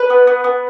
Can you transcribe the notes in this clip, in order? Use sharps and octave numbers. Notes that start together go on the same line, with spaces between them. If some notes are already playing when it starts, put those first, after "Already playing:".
Already playing: B4
B3
B3
B3